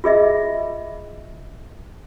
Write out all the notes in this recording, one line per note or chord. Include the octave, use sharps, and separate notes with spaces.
F4 G#4 D#5 E5